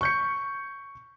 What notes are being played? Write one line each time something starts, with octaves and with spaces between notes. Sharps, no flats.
C#6 G6 C#7